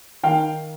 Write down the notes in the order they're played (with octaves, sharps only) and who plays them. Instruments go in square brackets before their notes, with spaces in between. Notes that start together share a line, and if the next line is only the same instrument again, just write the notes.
[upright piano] D#3 F5 G5